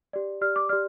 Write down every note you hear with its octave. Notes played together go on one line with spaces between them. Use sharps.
G4 D5
G4 D5 F6
D6
G4 D5 F6